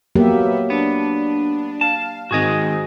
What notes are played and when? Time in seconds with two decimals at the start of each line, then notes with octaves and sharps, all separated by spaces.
0.15 F#3 A#3 B3 G4 E5
0.70 B3 D4
1.81 F5 A5
2.31 G#2 D#3 C4 F#4 G#4 D#5